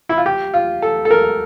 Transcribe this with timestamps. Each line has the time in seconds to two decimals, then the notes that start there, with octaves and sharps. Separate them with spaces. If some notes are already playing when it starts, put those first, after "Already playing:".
0.09 E4
0.18 F4
0.26 G4
0.54 F4
0.82 A4
1.05 A4
1.11 A#4